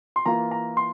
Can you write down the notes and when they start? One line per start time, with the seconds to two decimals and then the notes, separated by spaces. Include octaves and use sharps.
0.16 C6
0.26 E3 A#3 F4 A#5
0.51 A#5
0.77 C6